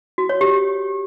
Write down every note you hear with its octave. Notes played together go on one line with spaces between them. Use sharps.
F#4
C#5
G4